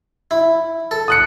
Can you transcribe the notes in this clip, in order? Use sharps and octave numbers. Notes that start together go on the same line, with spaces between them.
E4
A4
D#6 F#6 C#7